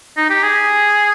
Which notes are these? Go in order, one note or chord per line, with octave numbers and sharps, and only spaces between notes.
D#4
G4
G#4